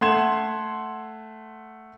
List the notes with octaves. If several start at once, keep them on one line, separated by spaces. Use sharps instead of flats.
A3 F#5 C6 G#6 E7